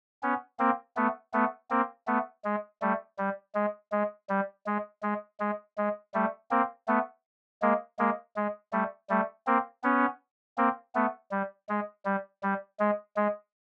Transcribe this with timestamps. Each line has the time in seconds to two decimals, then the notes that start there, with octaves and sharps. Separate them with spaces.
0.23 B3 C#4
0.59 A#3 C4
0.96 A3 B3
1.33 A3 B3
1.70 A#3 C4
2.07 A3 B3
2.45 G#3
2.82 G3 A3
3.18 G3
3.55 G#3
3.92 G#3
4.29 G3
4.66 G#3
5.03 G#3
5.40 G#3
5.78 G#3
6.14 G3 A3
6.51 A#3 C4
6.88 A3 B3
7.62 G#3 A#3
7.99 G#3 A#3
8.36 G#3
8.72 G3 A3
9.09 G3 A3
9.47 A#3 C4
9.83 B3 C#4
10.58 A#3 C4
10.95 A3 B3
11.31 G3
11.69 G#3
12.05 G3
12.43 G3
12.80 G#3
13.16 G#3